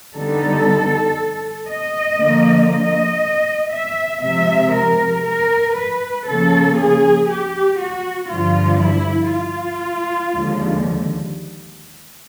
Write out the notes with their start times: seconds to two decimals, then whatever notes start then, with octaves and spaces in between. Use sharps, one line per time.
0.15 D3 G3 B3 D#4 A4
1.68 D#5
2.19 D3 F3 A#3
2.70 D#5
3.72 E5
4.23 C3 F3 G#3 E5
4.74 A#4
5.25 A#4
5.76 B4
6.27 C#3 F3 A#3 C#4 A4
6.78 G#4
7.29 G4
7.80 F#4
8.30 G2 D3 F3 F4
8.82 E4
9.32 F4
10.35 D#2 D3 F3 G#3